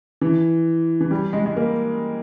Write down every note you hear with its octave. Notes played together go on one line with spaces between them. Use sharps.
E3
E3
G3
G#3
G#3
A#3